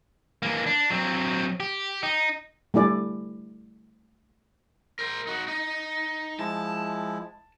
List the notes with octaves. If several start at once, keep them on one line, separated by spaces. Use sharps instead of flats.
E3 A#3
D4
F#3 C4
G4
D#4
G3 A3 E4 D5 G#5
A#4 C5
D#4 F#4
D#4 D#5
F3 G#3 E4 A5